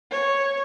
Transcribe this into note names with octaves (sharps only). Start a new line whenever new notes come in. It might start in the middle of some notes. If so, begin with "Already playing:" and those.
C#5